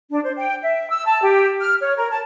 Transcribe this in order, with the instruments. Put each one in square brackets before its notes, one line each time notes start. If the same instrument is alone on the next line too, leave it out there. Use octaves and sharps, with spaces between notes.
[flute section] D4
C5
G5
E5
E6
A5
G4
F6
C#5
A#4
A5